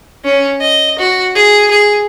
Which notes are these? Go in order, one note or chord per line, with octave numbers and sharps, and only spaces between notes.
C#4
D#5
F#4
G#4
G#4